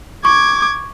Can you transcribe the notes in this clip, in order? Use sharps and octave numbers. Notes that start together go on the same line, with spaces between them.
C#6 D6 G#6